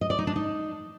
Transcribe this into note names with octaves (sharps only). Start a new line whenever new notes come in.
D#5
D5
D#4
D4
D#4